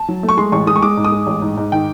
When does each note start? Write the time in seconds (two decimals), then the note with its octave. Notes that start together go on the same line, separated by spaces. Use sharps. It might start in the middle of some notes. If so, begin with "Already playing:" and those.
Already playing: A5
0.09 F#3
0.23 A3
0.29 C#6
0.37 G#3 C6
0.52 A1 C#6
0.67 G#3 D#6
0.76 C#6
0.83 G#3 D6
0.97 G#2
1.04 D#6
1.12 G#3
1.27 A1
1.42 G#2
1.57 G#2
1.72 D#3 G5